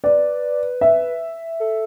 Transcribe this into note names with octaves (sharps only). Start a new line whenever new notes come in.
B4 D5
E5
A4